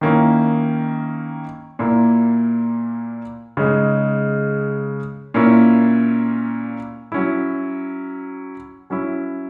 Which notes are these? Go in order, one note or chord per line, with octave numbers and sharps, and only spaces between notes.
D#3 A#3 C#4 E4
A#2 A#3 E4
C#3 G#3 D#4
A#2 A#3 C#4 E4
F#3 C#4 E4
F#3 C#4 E4